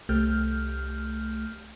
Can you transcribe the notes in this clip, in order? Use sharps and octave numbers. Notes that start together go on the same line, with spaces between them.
C2 A3 G4 F6 G6